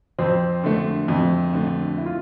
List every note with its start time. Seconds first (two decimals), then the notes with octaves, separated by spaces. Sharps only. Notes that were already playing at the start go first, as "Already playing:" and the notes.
0.19 F2 C4
0.64 D3 A3
1.08 F2
1.53 D3 A3
1.98 E4
2.06 F4